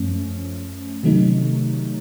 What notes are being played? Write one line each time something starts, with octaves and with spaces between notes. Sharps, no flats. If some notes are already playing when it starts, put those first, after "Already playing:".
Already playing: F#2 F3 A3 C#4
C3 D#3 F#3 A3 D#4